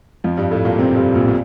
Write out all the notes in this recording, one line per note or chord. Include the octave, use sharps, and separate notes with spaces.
F2 F3
G2 G3
A2 A3
A#2 A#3
C3 C4
G2 G3
A#1 A#2
A#2